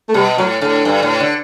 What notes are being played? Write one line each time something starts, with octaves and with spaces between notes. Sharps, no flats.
A3
B2 G3
A2 F#3
A2 D3
G2
A2
D3